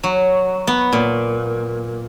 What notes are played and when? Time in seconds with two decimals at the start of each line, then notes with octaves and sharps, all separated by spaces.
0.03 F#3
0.67 B3
0.93 A#2